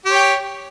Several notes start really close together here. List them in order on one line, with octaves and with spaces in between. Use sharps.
G4 C#5 G5